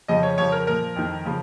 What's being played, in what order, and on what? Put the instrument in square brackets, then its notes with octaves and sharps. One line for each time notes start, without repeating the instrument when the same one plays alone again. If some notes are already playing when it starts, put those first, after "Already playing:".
[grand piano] F2 C#3 F3 D#5
C#5
F2 C#3 F3 C#5
A#4
A#2 F3 A#4
F2 D#3
C#3 F3